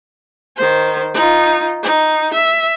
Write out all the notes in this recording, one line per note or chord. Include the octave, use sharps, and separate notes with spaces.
D#3 C5
D#4 F4
D#4
E5